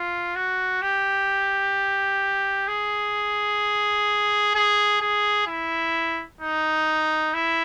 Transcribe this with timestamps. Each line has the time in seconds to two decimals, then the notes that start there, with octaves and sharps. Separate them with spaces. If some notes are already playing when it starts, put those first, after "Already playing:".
Already playing: F4
0.35 F#4
0.82 G4
2.67 G#4
4.54 G#4
5.01 G#4
5.47 E4
6.41 D#4
7.34 E4